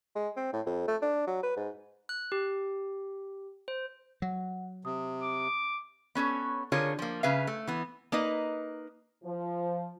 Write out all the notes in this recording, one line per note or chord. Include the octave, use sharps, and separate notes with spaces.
G#3
C4
A2
F2
A3
D4
F#3
B4
G#2
F#6
G4
C5
F#3 F#5
C3 D#6
D6
B3 C#4 A4 C#5
D3 F4 G#4 A#4 C#5
F3 A#3
C#3 B4 E5 F5
A3
E3 B3
A#3 D#4 B4 D#5
F3